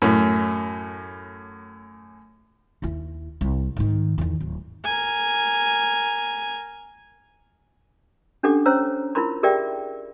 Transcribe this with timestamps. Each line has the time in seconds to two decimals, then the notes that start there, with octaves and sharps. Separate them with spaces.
0.02 F#2 A2
2.82 D#2 E4
3.41 C2
3.77 G#2 D#3
4.18 E2 D#3
4.40 D1
4.84 A#4 G#5
8.43 C#4 D4 G4 A4 F#5 D6
8.66 C#4 C5 C#5 A#5 E6
9.15 E4 F4 A#4 B5 C6
9.43 G4 G#4 A#4 D5 E5 G5